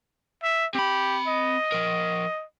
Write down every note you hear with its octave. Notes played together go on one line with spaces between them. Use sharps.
E5
C4 G4 B5
D#5
F3 A#4